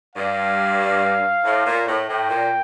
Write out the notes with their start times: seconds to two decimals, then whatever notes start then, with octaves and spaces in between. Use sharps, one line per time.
0.16 G2 F5
1.44 A2
1.66 A#2
1.86 A2
2.08 A2 G5
2.29 A#2